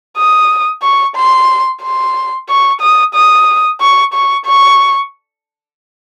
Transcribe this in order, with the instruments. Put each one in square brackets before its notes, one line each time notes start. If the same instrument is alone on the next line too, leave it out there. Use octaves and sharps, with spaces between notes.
[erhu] D#6
C#6
C6
C6
C#6
D#6
D#6
C#6
C#6
C#6